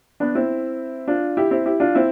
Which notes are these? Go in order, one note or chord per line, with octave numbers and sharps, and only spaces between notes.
B3 D4
C4 E4
D4 F4
E4 G4
C4 E4
E4 G4
D4 F4
C4 E4